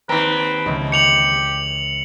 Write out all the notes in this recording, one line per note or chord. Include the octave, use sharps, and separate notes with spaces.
D#2 C4 B4 A#5
C#2 C#3 E3
G4 C#7 F7 F#7